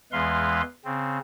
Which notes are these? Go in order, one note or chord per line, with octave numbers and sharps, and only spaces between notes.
E2 E3 G#3 B4 F5 C6
C#3 C4